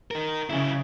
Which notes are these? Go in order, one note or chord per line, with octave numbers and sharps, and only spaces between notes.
D#4 A#4
C#3 F#3 E4